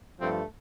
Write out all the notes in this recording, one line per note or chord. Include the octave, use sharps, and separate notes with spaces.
G2 F3 A3 C4